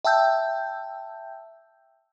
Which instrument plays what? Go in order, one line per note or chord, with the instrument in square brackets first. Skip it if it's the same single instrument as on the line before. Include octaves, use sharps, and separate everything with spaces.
[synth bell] E5 G5 A5 E6 G6